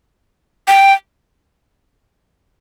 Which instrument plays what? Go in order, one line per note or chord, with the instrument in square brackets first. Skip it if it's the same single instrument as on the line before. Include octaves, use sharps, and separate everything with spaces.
[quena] G5